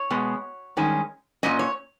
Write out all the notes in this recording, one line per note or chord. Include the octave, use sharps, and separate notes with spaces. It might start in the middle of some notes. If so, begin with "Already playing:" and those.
Already playing: C#5
B2 G#3 B3
G2 D#3 G#3 C#4
A#2 G3 C#4 D#5
C#5